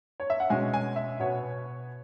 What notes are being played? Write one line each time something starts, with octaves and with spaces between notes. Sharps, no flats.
C#5
E5
F#5
B2 G#3 C#4 G#5
G#5
E5
B2 B3 C#5